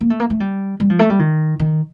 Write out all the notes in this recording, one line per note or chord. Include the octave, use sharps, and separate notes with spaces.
A#3
A3
A#3
A3
G3
G3
F3
A3
G3
D#3
D#3